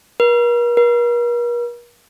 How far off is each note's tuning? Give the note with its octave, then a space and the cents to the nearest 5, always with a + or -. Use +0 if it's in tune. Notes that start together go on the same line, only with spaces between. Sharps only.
A#4 +45
A#4 +45